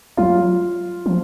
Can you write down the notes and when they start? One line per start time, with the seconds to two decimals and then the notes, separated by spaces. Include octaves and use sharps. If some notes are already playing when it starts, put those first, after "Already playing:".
0.17 F#3 F4
1.06 F3